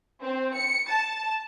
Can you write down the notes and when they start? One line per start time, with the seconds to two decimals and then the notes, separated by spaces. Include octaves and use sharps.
0.21 C4
0.55 C#7
0.88 A5